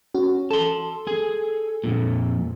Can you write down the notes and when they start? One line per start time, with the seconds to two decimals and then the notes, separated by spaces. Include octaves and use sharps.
0.15 C#4 F#4
0.51 A4 A5 C6
1.07 G#4 G#5
1.84 F2 A#2